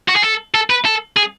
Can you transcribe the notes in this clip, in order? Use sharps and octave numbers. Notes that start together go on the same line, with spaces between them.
F#4
G#4
A4
A4
B4
A4
G#4